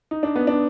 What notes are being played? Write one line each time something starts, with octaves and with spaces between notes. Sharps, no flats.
D#4
D4
B3
D4